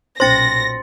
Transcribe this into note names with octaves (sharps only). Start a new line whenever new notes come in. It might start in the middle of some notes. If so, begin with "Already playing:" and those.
B1 A#2 C#4 C5 C6 A6 A#6 C#7